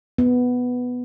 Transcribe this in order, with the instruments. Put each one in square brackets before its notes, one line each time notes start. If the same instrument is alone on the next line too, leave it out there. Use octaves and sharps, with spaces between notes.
[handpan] B3